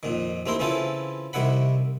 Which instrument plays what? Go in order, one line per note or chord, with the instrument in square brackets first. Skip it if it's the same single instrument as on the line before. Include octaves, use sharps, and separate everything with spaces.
[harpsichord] F2 A#2 D#3
D#2 A3 C4 E4 A#4 C6
C#3 E3 C4 E4 F4 A4
C2 C3 D#3 E4 F#5 B5